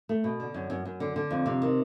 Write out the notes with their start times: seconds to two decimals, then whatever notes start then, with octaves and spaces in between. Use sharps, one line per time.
0.09 A3
0.24 B2
0.40 D3
0.54 F#2
0.70 F#2
0.85 F#2
1.00 D3
1.16 D3
1.31 F2
1.46 C3
1.62 D#3